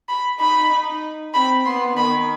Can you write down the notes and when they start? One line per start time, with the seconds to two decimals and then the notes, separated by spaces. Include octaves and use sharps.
0.09 B5
0.40 D#4 B5
0.72 D#4
1.34 C4 B5
1.66 B3 C6
1.97 D#3 B5